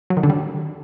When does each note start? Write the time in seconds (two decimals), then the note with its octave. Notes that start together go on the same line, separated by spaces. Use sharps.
0.10 F#3
0.17 D#3
0.23 D3
0.30 G3